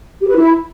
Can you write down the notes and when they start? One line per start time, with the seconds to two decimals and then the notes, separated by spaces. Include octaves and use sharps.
0.21 G4
0.28 B4
0.35 E4